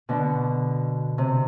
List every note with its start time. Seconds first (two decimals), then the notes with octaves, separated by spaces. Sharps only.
0.09 B2 D3
1.18 C3